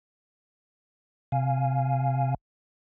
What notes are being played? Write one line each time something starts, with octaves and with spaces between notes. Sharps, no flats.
C3 F5 G#5